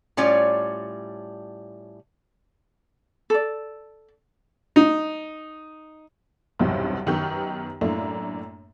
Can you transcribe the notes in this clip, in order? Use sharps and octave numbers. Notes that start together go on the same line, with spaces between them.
A2 G3 C#4 F4 C#5 D5
A4 D5
D#4
B1 E2 G2 C3
F#2 D#3 B3 G4 C#6 G6
F#2 A2 A3 A#3 D4